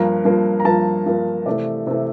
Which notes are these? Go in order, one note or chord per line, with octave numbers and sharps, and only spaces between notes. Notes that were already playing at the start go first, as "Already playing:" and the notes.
Already playing: G2 F3 A#3 A#5
G2 F3 A#3
A#5
G2 F3 A#3 A5
G2 F3 A#3
C3 E3 A3 D5
C3 E3 A3